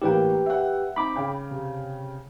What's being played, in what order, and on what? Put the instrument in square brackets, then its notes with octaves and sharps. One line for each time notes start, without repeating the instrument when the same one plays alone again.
[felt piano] A2 E3 A#3 [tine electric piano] G4 B4 G5
[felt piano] E5 F#5
[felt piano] C4 D#4 [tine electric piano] B5 D6
[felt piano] C#3 G5
[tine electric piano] C3